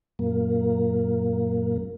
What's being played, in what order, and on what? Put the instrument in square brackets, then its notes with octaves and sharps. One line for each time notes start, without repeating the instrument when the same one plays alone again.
[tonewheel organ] F#2 A#2 A#3